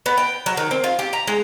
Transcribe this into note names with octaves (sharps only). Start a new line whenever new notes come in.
B3
G5
F#3
D#3
C4
F4
G4
A#5
G#3